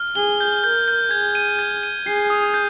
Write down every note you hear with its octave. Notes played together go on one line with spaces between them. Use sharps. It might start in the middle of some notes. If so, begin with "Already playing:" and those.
Already playing: F6
G#4 G7
G6
A#4 G6
G6
G#4 G#6
D#7
G#6
D#7
G#4 C7
D#6
G6